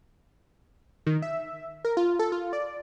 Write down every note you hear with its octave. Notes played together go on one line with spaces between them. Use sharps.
D#3
E5
A#4
F4
A4
F4
D5